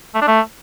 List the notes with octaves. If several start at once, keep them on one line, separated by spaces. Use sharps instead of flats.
A3
D4
A3